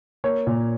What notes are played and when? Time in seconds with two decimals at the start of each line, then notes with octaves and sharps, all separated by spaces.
0.24 A#3 C#5
0.47 A#2